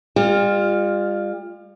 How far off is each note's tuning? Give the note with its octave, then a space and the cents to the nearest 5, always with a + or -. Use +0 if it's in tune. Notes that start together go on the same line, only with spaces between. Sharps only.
G3 +40 F4 +0